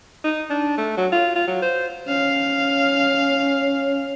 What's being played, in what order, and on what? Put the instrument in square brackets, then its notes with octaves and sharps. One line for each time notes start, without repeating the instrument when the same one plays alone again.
[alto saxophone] D#4
D4
A3
F#3
F4
F4
F#3
C5
[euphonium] C#4 [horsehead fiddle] F5